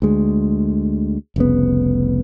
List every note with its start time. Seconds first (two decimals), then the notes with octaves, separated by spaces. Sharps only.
0.02 D2 G#3
1.36 F1 C2 C#3 B3